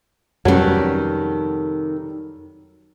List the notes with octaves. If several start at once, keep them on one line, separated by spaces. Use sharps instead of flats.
F2 C3 D#3 F#3 G3 C#4 A4 B4